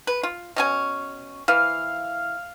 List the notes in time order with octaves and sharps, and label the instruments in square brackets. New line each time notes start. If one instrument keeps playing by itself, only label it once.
[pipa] B4
F4
B2 C#4 G#5
[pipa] E3 [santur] F5